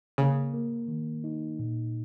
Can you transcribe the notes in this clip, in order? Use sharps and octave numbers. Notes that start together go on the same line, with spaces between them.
C#3 A#3
A#3
D#3
D#4
A#2